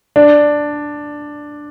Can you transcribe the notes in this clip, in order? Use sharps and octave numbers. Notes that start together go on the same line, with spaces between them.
D4